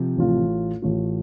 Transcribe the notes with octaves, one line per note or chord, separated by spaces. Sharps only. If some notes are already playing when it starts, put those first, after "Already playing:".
Already playing: C3 F3
A1 A2 A3 F4
A1 A2 A3 F4